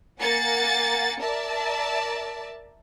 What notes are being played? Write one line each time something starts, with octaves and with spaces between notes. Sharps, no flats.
A#3 F#5 G#5 A6 C#7
A#4 D5 E5 A5